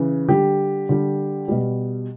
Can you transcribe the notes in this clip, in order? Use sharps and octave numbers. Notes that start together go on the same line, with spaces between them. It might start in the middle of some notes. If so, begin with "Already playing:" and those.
Already playing: C#3 E3
D3 G3 G4
D3 G3
B2 G3